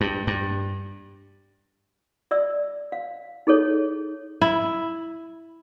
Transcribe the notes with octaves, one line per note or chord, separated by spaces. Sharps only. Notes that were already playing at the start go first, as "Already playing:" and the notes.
G2
G2
D5 E5 E6
F5
D#4 G#4 A4 C#5
E4